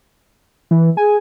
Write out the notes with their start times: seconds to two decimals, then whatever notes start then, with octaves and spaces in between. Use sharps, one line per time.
0.71 E3
0.97 G#4 G#5